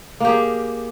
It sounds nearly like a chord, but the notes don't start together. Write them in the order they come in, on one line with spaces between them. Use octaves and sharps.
A#3 G4 G#4